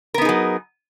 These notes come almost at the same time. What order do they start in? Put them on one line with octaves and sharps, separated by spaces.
A#4 B3 D#4 G#4 F#3